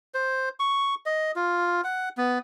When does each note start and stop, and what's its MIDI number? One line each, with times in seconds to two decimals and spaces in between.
0.14 0.49 72
0.60 0.95 85
1.06 1.31 75
1.36 1.81 65
1.84 2.09 78
2.17 2.39 59